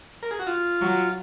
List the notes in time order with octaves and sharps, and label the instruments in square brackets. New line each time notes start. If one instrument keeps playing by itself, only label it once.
[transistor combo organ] A#4
G#4
F#4
F4
[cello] F#3